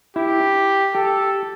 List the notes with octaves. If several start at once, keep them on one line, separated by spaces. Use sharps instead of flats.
E4 G4
G4 A4